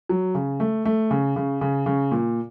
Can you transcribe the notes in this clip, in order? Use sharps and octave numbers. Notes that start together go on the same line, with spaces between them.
F#3
C#3
A3
A3
C#3
C#3
C#3
C#3
A#2